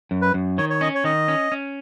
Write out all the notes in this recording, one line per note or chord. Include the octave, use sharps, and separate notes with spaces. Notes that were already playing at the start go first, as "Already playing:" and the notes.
F#2
B4
F#2
D#3 C#5
C#5
C#4 D#5
C#5
D#3 D#5
C#4
C#4